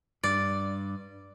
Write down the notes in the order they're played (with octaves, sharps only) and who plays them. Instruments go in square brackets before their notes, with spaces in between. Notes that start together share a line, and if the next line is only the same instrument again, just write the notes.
[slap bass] G2 [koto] D5